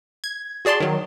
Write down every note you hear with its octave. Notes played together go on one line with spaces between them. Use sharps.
G#6
F#4 G#4 D5 A5 C6
D#3 F#3